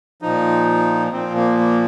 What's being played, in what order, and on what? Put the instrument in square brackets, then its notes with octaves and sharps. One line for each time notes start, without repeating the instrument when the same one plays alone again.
[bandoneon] A#2 F3 D#4
A#2 F3 C4
A#3
A#3